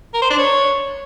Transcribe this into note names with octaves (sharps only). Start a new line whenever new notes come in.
A#4
C5
D4
C#5